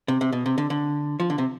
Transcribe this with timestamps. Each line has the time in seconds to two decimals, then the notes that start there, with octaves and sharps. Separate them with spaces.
0.08 C3
0.21 C3
0.32 B2
0.46 C3
0.58 D3
0.70 D3
1.20 F3
1.30 D3
1.38 C3